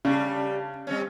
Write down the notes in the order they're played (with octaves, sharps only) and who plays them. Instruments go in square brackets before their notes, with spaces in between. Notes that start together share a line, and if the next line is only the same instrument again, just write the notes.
[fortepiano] C#3 [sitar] G3 A3 D4
[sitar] G3 C4 C#4